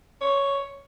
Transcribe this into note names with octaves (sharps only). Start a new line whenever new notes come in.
C#5